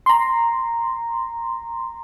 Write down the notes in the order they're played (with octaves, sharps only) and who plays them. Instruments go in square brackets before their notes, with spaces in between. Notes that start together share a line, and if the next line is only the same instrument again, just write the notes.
[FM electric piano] A#5 C6